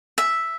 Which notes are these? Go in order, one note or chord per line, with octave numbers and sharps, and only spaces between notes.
E5